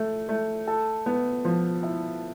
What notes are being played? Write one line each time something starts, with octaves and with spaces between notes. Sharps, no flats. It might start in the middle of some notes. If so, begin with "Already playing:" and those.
Already playing: A3
A3
A4
B3
F3
E4